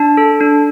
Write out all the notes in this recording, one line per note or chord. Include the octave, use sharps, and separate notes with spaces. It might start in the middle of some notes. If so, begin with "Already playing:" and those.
Already playing: D4 A5
A4
D4